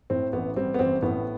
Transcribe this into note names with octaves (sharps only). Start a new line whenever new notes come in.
A2 C4
A1 B3
G3 C4
B3
A1 C4
A2 B3